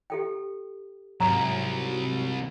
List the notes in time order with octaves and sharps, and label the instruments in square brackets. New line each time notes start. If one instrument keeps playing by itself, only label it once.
[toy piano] G4 A4 G5
[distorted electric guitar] C2 [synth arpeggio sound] G#2 F#3 [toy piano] A#5